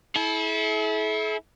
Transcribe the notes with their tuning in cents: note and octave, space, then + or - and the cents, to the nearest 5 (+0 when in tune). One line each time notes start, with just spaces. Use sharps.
E4 -20 A4 -45